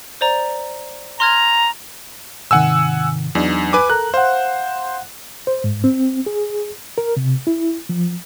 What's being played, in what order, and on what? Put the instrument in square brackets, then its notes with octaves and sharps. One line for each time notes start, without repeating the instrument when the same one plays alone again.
[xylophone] C5 D5 A#5
[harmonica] A#5 [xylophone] C6 F6 G#6
[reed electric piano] G#2 C3 D#3 [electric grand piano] F#5 G#5 E6
[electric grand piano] E2 [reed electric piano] F#3 D4 D#4
[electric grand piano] B4 G#5 D6
[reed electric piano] A4 A#4 A#5 [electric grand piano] F#6
[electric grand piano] C5 [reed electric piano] F5 F#5
[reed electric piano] C5
G#2
C4
G#4
A#4
C3
E4
F3